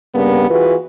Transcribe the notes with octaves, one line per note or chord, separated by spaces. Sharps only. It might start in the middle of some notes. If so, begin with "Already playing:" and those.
G2 C#3 G3 A#3 B3
E3 F4 F#4 G#4 B4